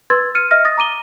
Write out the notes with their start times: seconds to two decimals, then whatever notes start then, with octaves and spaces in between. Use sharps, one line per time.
0.10 B4 C6 E6 G#6 A6
0.35 F6 C#7 D#7
0.51 D#5 E5 F6 A#6
0.65 D#6 A6 A#6
0.78 A#5 D6 D#7 G7